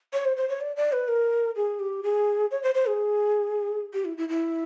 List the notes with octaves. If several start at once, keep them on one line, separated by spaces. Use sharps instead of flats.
C#5
C5
C5
C#5
D5
D5
B4
A#4
G#4
G4
G#4
C#5
C5
C5
G#4
G4
E4
E4
E4